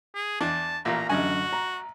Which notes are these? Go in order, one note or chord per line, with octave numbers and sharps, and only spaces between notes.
G#4
E2 D4 A5
A1 A#2 F4 A#5
A1 F#2 D3 F#4 D#5 G#5
A#5